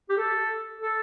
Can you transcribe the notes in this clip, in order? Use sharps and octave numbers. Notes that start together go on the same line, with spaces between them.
G4
A4
A4